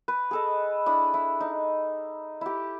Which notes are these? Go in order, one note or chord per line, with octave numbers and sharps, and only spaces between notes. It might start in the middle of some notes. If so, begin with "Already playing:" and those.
B4
G#4 A4 D#5
D4 E4 B5 D#6
E4
D#4
E4 G4